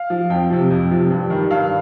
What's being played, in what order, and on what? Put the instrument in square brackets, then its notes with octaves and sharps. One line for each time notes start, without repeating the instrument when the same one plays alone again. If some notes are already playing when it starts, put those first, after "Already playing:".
Already playing: [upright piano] F5
F3
F2 G5
C3 F3
F2
C3 F3
G2
D#3 G3
G2 F5